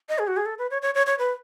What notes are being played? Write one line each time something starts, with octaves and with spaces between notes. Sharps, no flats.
D#5
G#4
F#4
G#4
A4
B4
C#5
C#5
C#5
C#5
B4